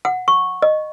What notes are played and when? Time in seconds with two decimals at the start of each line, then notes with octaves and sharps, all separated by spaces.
0.05 F#5
0.28 C#6
0.62 D#5